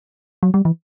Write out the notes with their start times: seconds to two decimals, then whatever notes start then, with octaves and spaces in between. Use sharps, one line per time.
0.43 F#3
0.54 G3
0.65 E3